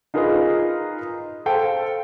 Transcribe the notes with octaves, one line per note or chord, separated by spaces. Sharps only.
D#4 F4 G#4 A#4 B4 D#5
A4 C5 F5 G5 A5